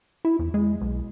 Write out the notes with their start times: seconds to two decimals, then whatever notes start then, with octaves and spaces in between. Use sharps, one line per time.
0.25 E4
0.39 E2
0.54 G#3
0.81 B1